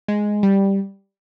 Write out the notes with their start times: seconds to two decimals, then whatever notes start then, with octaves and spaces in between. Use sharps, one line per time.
0.08 G#3
0.43 G3